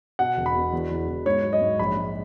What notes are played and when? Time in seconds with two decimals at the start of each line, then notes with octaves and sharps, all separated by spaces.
0.19 B2 F#5
0.37 E1
0.46 B5
0.55 B2
0.72 E2
0.91 E2
1.08 E2
1.25 G#2 C#5
1.44 F#3
1.53 D#5
1.61 G#2
1.79 A#1 B5
1.97 G#3